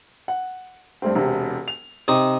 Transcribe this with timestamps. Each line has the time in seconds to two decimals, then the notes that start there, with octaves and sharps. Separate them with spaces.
0.28 F#5
1.02 G2 A3 C4
1.15 E1 C3
1.68 F7
2.08 C3 D#4